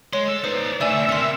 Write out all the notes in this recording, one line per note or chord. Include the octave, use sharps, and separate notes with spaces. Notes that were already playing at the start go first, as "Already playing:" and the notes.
G#3 C#5 C6
A4
D#4 B4 C5 D5 D#6
D3 A3 D5 E5 G#5
C4 A#4 C6 C#7